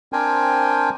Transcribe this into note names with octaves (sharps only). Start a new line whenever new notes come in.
C4 D4 A#4 C5 G5 G#5